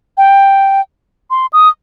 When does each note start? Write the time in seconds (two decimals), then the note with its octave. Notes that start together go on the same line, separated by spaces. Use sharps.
0.18 G5
1.31 C6
1.53 D#6